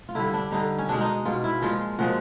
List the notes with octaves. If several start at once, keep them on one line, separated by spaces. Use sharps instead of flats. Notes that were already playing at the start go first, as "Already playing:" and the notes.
F4
D3 G3 E4
D4
D3 G3 D#4
C#4
B2 G#3 D4
D#4
B2 G#3 F4
E4
A#2 F3 G#3 F4
A#2 F3 G#3 F#4